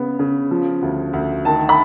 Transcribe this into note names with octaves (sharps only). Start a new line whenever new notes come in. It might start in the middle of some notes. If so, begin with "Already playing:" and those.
Already playing: C#3 B3
C#3
F3
D2
D2
D#3 A5
B5